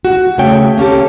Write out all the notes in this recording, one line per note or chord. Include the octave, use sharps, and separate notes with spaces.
F#4
C#3 A3 C#5 G5
A#3 C#4 G4 A4